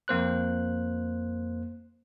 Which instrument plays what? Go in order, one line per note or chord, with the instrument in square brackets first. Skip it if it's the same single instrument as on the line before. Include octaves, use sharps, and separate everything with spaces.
[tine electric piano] F2 A#3 C5 F#6